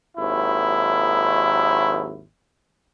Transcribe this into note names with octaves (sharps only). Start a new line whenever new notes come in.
G#1 D#2 F#3 E4